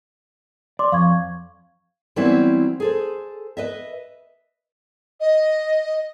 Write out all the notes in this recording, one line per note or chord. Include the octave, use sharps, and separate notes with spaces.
D5 C6 D6
F2 F5 C#6 G#6
E3 F#3 G3 B3 C4 E4
G#4 A4 C5
B4 D#5 E5
D#5